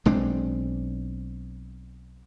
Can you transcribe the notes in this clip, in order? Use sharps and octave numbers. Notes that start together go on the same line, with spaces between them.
B1 G#3 C4 D4